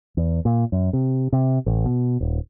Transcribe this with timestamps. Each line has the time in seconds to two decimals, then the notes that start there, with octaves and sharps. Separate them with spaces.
0.17 E2
0.45 A#2
0.72 F#2
0.93 C3
1.33 C3
1.66 A1
1.85 B2
2.21 D#1